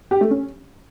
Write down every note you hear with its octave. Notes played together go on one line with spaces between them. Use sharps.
G4
A3
C#4